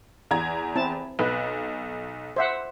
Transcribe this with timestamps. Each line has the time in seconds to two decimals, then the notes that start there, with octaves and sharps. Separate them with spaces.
0.31 E2 A#5 G#6
0.76 C4 E4 A5
1.19 B1 B4
2.36 C5 E5 F#5